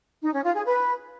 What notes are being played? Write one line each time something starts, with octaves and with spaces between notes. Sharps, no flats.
D#4
C#4
F4
G#4
B4